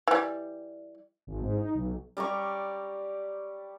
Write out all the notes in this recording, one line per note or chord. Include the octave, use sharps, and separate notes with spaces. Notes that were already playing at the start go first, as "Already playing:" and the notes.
E3 G3
G#1
G#2
D#4
B1
G3 D5 A#5 C#6